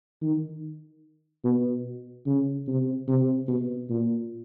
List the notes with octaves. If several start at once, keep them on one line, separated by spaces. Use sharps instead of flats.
D#3
B2
C#3
C3
C3
B2
A#2